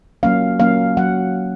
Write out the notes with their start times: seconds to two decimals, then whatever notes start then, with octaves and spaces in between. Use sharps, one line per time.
0.23 F#3 A#3 C#4 F5
0.60 F#3 A#3 C#4 F5
0.97 F#3 F#5